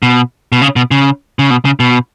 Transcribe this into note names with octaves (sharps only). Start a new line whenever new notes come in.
B2
B2
C#3
B2
C#3
C#3
B2
C#3
B2